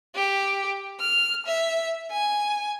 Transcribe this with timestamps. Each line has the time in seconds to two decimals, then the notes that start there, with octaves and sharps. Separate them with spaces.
0.15 G4
1.00 F6
1.46 E5
2.11 G#5